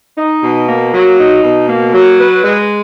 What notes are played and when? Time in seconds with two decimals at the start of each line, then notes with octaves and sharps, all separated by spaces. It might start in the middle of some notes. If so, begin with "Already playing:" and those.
0.17 D#4
0.42 B2
0.67 A#3
0.93 F#3
1.17 D#4
1.43 B2
1.67 A#3
1.94 F#3
2.18 B4
2.43 G#3